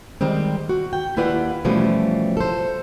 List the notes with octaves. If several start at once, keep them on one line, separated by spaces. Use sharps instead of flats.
D#3 G3 G#3 C4
F#4
G5
D#2 E4 F4 B4 D5 F#5
B2 E3 F3 G3 A3 C#4
A4 C5